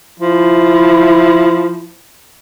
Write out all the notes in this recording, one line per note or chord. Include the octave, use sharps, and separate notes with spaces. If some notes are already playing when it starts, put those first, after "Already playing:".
F3 E4